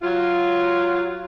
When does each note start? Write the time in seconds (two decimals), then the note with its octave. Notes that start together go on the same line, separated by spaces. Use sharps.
0.02 F#3 F4